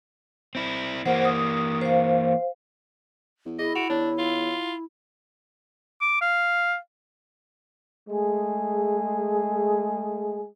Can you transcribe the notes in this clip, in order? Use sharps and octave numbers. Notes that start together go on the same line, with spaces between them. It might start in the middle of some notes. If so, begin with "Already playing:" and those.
C4 E4
E3 A#3 C5 F#5
D#6
C5 F5
E2
E4 G#4 D#5
F#4 D7 E7 F7
E2 D4 C#5
F4
D6
F5
G#3 A3 G#4